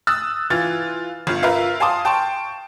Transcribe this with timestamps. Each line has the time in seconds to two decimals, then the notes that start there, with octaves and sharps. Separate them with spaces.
0.07 D#6 E6 F#6 A6
0.50 E3 F4 A6
1.27 G1 F4
1.43 F4 A#4 B4 E5 F5
1.80 F5 G#5 A5 C6 D6 D#6
2.05 G5 A5 C6 C#6